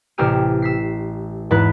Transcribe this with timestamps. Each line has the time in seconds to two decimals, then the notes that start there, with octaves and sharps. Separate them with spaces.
0.18 A1 C3 G4 E6 F6 D#7
0.62 E6 B6 C7
1.51 E2 G#2 E3 B4 F#6